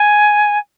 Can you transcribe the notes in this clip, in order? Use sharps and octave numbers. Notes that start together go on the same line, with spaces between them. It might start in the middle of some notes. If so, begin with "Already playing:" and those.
Already playing: G#5